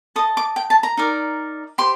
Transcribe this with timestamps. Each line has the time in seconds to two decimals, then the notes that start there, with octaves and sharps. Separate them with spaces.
0.16 A4 D#5 D#6
0.37 D6
0.56 G5
0.70 A5
0.83 A#5
0.97 D#4 A#4 D5
1.78 G4 C5 C6